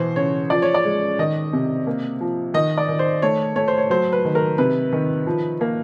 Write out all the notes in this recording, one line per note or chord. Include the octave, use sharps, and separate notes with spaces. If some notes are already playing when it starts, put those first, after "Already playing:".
Already playing: B2 E3 C5
C#3 C#5
F3 D5
C#5
D5
G#3
D#3 D#5
C3
A#3
F3
D#3 D#5
D5
D#3
C5
A3 C#5
A3 C#5
C5
C#5
F#3 C5
B4
D#3
A#4
C3 B4
D#3
F3
A#3